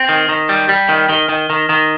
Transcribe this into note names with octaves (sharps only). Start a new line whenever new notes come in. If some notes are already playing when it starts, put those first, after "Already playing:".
Already playing: C4
D#3
D#3
G3
G3
D#3
D#3
D#3
D#3
D#3